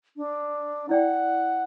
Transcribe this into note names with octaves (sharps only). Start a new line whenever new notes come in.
D4
E4 D5 F#5 G5